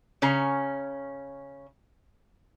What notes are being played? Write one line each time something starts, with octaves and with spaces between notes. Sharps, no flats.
C#3 C#4 A#5